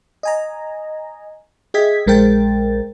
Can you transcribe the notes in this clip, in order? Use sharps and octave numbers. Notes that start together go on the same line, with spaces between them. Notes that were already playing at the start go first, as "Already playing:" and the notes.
D#5 G#5 A#5
G#4 D#5 E5 G5 G#6 B6
A#1 G#3 A#4 C5 G5 A6